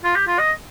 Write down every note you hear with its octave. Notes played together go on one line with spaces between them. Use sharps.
F4
G4
F4
D#5